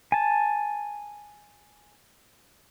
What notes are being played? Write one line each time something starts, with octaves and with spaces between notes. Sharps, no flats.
G#5 A5